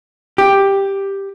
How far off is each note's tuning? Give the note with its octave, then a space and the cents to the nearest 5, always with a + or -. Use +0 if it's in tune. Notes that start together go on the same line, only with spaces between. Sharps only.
G4 +5